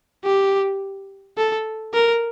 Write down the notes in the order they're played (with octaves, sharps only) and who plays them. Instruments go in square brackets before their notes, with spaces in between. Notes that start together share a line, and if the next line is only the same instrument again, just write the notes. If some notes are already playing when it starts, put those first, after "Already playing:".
[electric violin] G4
A4
A#4